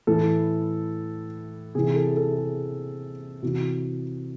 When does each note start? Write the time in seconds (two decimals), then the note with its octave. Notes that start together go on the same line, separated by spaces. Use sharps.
0.07 A2 E3 A4
1.75 C3 E3 G#4
1.96 A4
2.17 A4
2.38 G#4
3.43 C3 E3 F#4